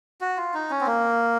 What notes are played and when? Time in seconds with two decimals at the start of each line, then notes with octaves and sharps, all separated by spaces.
0.21 F#4
0.37 F4
0.54 D#4
0.70 C#4
0.81 C4
0.87 A#3